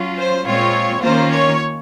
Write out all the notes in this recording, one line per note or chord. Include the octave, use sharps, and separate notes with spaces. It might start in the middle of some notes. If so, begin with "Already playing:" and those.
Already playing: F#3 C#4 F4
C5
A#2 G#3 C4 F4 C#5
D#3 A#3 C#4 F4 C5
C#5